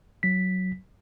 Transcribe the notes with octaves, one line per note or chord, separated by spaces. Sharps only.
F#3 B6